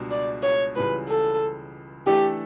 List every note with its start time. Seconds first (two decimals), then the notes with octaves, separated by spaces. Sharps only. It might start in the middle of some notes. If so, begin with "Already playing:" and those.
Already playing: C#2 B2 G3 D4
0.11 D5
0.43 C#5
0.76 C#2 C#3 E3 G3 B4
1.09 A4
2.06 E3 A3 D4 G4 A4